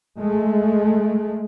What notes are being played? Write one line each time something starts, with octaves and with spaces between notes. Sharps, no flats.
G#3 A3